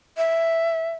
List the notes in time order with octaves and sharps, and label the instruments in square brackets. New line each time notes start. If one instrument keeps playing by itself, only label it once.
[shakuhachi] E5